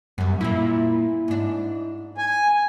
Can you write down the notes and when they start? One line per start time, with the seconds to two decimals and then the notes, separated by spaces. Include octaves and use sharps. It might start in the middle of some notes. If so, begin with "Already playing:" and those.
0.18 F#2 G3 B3
0.41 A#2 A#3 E4
1.28 G#2 D4
2.18 G#5